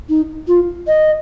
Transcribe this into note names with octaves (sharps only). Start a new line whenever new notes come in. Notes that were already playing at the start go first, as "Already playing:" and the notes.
D#4
F4
D#5